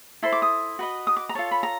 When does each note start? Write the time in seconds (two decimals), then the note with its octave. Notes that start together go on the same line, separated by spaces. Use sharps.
0.22 E4 A4 C5 C6
0.32 D6
0.42 D#6
0.79 F#4 B4 D#5
1.07 D#6
1.17 D6
1.29 A#5
1.35 F4 A4 C#5 A5
1.51 B5
1.63 A#5